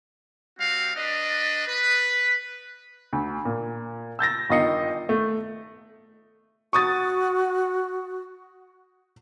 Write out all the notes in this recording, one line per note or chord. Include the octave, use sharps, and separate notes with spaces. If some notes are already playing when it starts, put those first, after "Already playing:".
G3 C4 F#4 F5
D4 B4 D5 D#5
B4
D2
A#2
E6 G6 A6 A#6
G1 D#3 F4 D#5 C7 C#7
A3
F#4 C#6 D#6 A6